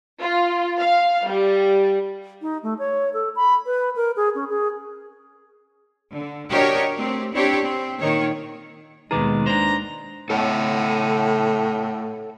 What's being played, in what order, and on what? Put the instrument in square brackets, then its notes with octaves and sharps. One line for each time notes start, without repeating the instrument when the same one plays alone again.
[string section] F4
F5
G3
[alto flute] D#4
A3
C#5
A4
B5
B4
A#4
G#4
C#4
G#4
[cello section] D3
D4 F#4 G4 A#4 C#5 D#5
A3 C4 G4
C4 D4 E4 G4 C#5
C4
A#2 D#3 C#5
[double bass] D#2 G#3 [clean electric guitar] B2 D#3 G#4 [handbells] D#4 B4 D6
[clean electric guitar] D4 C5 [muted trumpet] A#5
[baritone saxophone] A2 [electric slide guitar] A4 C#5 F#5